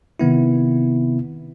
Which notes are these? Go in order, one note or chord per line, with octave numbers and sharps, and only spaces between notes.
C3 D#3 B3 E4